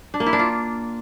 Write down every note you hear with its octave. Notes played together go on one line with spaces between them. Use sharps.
D4
A#3
E4
D4
F4